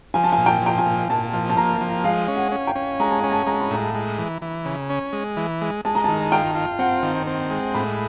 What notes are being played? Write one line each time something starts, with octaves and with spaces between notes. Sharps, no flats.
F3 G#5
A5
G#5
A#2
G5
F3 G5
G#5
A#2
A#2 A5
F3
A5
A#3 A#5
F3
G#3 F5
C#4
F#5
C#4
G5
C#4
G#3 A#5
A5
C#4 G#5
A5
G#3 A#5
B5
A2 A#5
G#3
E3
E3
C#3
C#4
G#3
E3
G#3
G#3 A5
A#5
A5
D#3
F4 G5
F4
C4 F#5
D#3
C4
G#3
A2 B5